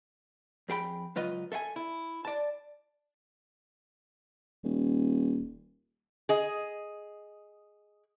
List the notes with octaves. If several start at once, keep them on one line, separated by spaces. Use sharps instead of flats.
F2 G#4 G5 B5
C#2 F#3 F4 B4 D#5
A4 E5 F5 G#5
E4
D5 A5
D#1
G#4 D#5